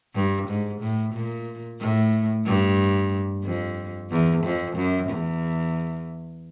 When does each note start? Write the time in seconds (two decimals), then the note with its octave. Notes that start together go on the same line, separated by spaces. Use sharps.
0.15 G2
0.48 G#2
0.81 A2
1.14 A#2
1.80 A2
2.45 G2
3.44 F2
4.11 E2
4.44 F2
4.76 F#2
5.09 E2